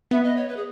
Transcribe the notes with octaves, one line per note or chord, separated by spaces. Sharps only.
B3 E5
D#5
C#5
B4
G#4